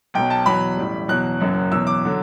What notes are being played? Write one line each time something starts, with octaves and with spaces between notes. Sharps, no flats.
B1 B2 F#3 G5
A5
E2 B2 F#3 B5
A1 A2 G3
E2 B2 F#3 F#6
F#1 F#2 F#3
E2 B2 F#3 E6
D6
D3 F#3